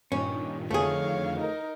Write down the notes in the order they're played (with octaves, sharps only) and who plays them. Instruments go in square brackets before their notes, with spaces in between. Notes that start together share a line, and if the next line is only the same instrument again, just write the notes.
[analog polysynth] G2 A#2 D#3 [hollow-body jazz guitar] C#4
[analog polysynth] F2 D3 D#3 [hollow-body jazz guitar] A3 G#4 [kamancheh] C#5 F5
[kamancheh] D#4 A#4